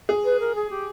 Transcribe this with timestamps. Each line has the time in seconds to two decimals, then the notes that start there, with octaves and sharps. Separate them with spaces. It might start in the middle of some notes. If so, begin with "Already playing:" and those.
0.09 G#4
0.24 B4
0.40 A#4
0.55 G#4
0.70 G4